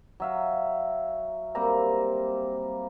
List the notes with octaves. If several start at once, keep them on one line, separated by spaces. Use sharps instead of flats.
F#3 E5 F5
G3 A#3 C4 A#5